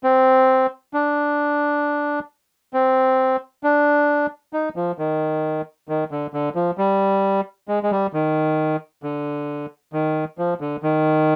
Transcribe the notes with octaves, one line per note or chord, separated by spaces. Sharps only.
C4
D4
C4
D4
D#4
F3
D#3
D#3
D3
D3
F3
G3
G#3
G#3
G3
D#3
D3
D#3
F3
D3
D#3